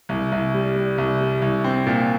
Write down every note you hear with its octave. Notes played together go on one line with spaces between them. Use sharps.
C2
C2
G3
G3
C2
G3
C2
C4
A#2